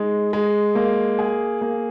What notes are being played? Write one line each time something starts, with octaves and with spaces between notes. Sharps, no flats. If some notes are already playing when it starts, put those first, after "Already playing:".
Already playing: G#3 D#4
G#3
A#3
G#4
A#3